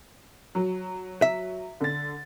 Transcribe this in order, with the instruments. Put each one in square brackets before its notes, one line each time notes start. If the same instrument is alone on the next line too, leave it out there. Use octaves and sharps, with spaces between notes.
[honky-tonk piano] F#3
[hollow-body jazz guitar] E5
[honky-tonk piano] D3 A6